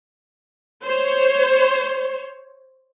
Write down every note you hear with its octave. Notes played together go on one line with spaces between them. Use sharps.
C5 C#5